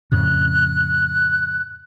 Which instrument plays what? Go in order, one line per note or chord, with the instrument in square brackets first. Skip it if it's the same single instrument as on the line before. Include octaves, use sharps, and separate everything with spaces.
[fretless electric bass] F2 A2 C#3 [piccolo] F#6